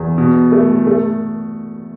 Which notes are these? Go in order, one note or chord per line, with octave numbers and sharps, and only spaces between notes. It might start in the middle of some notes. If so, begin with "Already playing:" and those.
Already playing: E2
B2
A3
A3